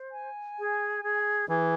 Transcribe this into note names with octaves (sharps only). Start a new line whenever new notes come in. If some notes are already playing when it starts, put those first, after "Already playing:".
Already playing: C5
G#5
G#4
G#4
E3 G#4